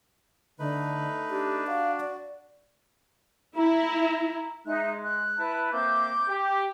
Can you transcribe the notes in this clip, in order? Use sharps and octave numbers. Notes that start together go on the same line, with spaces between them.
D3 A3 D#4 B4
D4 G4
F#4 F5
D5
E4 A#5
G#3 D#4 E5 F#6
F#6
E4 B4 A5
A#3 C4 E5 D6 G6
G4